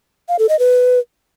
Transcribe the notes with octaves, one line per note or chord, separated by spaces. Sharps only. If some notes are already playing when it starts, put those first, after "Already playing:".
F5
A4
D#5
B4